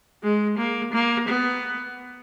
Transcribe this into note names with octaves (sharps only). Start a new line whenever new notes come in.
G#3
A#3
A#3
B3